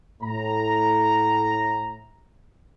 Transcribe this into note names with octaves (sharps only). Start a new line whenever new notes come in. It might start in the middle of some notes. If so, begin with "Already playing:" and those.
A2 A#5